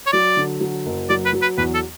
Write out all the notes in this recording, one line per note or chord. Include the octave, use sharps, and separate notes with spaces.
C#5
F#3 D5
D3
F#3
F#1
F#3 D5
B4
F#3
B4
E2 B4
A4